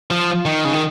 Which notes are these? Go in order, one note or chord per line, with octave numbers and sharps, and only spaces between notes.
F3 F4
D#3 D#4
C#3
D#3